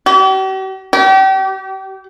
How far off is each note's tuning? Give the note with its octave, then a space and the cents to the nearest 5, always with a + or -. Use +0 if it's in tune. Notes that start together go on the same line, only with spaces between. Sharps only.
G4 -45
G4 -35